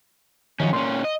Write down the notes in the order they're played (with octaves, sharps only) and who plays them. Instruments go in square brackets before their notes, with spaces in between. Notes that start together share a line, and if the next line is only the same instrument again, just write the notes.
[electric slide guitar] F#2 C#4 [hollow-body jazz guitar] D#3 F3
[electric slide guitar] A#2 C#4 [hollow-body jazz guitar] C6
[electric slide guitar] D#5